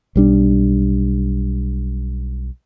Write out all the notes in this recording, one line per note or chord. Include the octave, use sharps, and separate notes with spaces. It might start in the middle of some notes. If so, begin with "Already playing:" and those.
B1 G3 D4